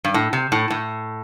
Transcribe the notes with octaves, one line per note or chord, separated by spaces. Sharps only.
G2
A2
C3
A2
A2